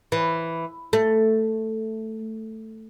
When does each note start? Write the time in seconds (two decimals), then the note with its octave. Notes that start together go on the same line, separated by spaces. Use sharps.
0.12 E3
0.93 A3